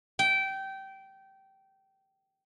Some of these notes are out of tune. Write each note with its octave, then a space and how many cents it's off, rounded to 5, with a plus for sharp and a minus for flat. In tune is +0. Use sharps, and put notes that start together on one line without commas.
G5 -20